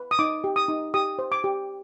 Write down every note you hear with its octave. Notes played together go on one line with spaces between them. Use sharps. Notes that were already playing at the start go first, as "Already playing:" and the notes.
Already playing: B4
D#6
D#4 D6
G4
D#6
D#4
G4 D#6
C5
D6
G4